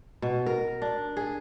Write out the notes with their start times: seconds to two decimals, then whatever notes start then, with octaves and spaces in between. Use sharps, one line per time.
0.22 B2
0.46 A#4
0.82 D4
1.17 G#4